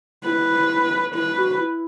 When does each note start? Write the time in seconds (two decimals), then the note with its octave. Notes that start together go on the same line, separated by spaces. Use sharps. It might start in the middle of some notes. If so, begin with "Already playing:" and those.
0.24 E4 B4
1.14 E4 B4
1.38 F#4
1.59 E4